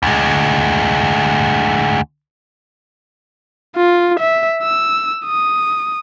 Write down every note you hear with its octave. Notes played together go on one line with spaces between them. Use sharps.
D2 G#3
F4
E5
E6
D#6